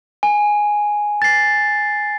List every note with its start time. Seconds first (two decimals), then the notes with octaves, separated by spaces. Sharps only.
0.23 G#5
1.22 A6 C7